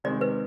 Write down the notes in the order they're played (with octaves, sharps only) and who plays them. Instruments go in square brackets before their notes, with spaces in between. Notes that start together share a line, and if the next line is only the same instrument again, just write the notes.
[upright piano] C3 D#3 G#3 C4 [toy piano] D5
[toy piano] B4